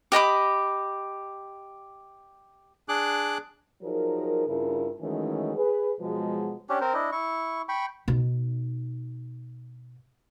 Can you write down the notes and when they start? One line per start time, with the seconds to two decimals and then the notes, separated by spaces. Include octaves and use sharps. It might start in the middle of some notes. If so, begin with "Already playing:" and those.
0.12 G4 D#5 B5 D6
2.89 D4 G#4 D6 F#6
3.82 F3 F#3 D#4 G#4 A#4
4.48 G2 C#3 E4 F4 A#4
5.00 D#3 E3 F#3 G#3 A3 C#4
5.55 G#4 B4
5.99 B2 F3 F#3 G#3
6.69 C#4 D4 G4
6.81 C4 A#4 C5
6.94 D4 E4 D#5
7.12 E4 C#6
7.69 G5 B5 C#6
8.08 B2 D#4